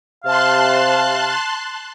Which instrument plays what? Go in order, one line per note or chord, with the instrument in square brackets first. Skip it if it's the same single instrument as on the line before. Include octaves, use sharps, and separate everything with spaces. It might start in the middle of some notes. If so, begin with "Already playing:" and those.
[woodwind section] C3 F5 [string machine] A5 C6 F#6